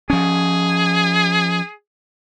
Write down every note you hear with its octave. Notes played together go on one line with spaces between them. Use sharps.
F3 C#4 G#4